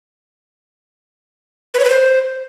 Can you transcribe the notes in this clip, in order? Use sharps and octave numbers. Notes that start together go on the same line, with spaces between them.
B4
C#5
B4
C5